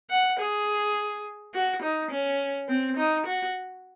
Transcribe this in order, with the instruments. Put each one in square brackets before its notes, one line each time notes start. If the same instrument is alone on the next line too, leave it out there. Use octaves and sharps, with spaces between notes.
[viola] F#5
G#4
F#4
D#4
C#4
C4
D#4
F#4